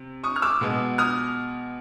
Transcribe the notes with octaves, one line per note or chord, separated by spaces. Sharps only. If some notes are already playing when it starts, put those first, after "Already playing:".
Already playing: C3
C#6 D#6
F6
D6 E6
B2 G#3 B3
D#6 F6